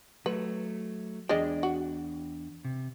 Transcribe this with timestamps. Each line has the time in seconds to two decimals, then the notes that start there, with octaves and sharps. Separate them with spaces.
0.26 F#3 A3 B4
1.29 E2 G#3 D4 D5 D#5 G5
1.63 F#4
2.65 C3